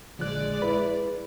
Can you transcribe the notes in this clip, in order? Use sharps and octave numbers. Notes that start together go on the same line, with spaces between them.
A#1 D3 F3 G#3 D5 F#6
E4 B4